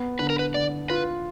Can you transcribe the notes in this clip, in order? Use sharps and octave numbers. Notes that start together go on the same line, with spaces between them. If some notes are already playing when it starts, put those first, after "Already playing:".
Already playing: B3
D3 B4
A#4
B4
D3 D5
F4 B4